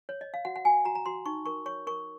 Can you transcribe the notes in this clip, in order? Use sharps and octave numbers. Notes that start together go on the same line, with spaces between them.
C#5
D#5
F5
F#4 F#5
F#5
F#4 G#5
F#4 A#5
A#5
F#4 C6
D#4 C#6
A#4 C#6
C#5 C#6
A#4 C#6